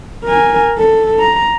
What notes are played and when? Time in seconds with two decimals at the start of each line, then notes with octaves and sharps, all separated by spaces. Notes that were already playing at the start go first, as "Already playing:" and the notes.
0.25 A#4 G#5
0.79 A4
1.19 A#5